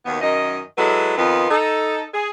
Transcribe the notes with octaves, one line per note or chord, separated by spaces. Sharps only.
D#2 B2 D#3 B3
F#2 D#3 D#5
F#3 G#3 E4 A4 B4
F2 D#3 B3 F4 B4
D#4 A4
G#4